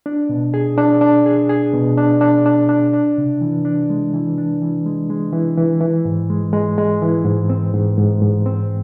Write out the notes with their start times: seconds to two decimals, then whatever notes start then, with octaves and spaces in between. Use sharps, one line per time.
0.06 D4
0.29 B2
0.54 G#4
0.78 D4
1.01 D4
1.26 G#4
1.49 G#4
1.74 B2
1.98 D4
2.21 D4
2.46 D4
2.69 D4
2.93 D4
3.18 C3
3.41 E3
3.65 D4
3.90 G#3
4.14 E3
4.38 D4
4.62 E3
4.86 G#3
5.10 G#3
5.33 E3
5.58 E3
5.81 E3
6.05 G#2
6.30 G#3
6.53 G#3
6.78 G#3
7.02 E3
7.25 G#2
7.49 C4
7.74 G#2
7.98 G#2
8.21 G#2
8.46 C4